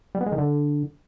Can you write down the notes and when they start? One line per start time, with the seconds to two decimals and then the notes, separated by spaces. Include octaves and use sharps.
0.15 G3
0.21 B3
0.26 G#3
0.32 D#3
0.38 D3